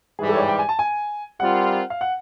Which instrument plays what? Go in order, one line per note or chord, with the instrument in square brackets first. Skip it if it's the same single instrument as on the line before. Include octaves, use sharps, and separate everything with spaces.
[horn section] G#2 E3 G3 [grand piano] G#4
[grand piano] A4
C#5
D5
G5
G#5
A5
G#5
[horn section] G3 C4 F4 A#4 [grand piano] F#5
[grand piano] F5
F#5